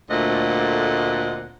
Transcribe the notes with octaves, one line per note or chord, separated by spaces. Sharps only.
D2 A#2 A3 C4 D#5 F#5